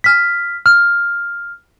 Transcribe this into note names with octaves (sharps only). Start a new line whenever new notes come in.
F6 B6
F6